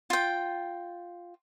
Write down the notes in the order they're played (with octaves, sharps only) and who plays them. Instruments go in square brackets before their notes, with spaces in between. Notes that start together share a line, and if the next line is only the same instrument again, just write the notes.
[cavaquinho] F4 G5